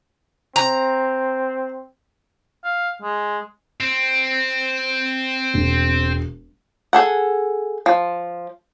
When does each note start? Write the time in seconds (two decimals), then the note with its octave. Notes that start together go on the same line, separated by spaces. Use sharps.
0.56 C4 A#5
2.64 F5
3.02 G#3
3.81 C4
5.54 E1
6.93 G#4 A4 F#5
7.86 F3